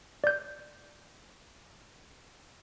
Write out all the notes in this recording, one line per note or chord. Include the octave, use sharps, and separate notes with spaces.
D5 G6